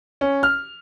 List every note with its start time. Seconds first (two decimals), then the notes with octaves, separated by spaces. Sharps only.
0.21 C#4
0.43 F6